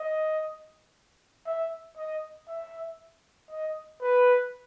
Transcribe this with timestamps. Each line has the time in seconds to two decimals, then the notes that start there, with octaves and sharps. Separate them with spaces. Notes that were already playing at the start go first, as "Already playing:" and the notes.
Already playing: D#5
1.46 E5
1.97 D#5
2.48 E5
3.50 D#5
4.01 B4